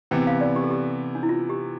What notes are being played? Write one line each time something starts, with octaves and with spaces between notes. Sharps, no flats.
C3 E3 B3 G5
F5
D5
G4
A4
G4
D4
E4
F4
G4